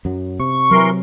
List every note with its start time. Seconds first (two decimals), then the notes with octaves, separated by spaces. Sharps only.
0.05 F#2 F#3
0.39 C3 C#6
0.71 E3 F#3 A#4 C6